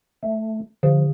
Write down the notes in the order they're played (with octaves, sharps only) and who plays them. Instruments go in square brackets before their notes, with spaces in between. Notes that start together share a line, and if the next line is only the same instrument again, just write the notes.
[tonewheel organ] A3
[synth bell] D3 [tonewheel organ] F3